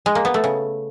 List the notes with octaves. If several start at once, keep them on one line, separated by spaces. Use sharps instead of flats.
G#3
A#3
B3
A3
C#3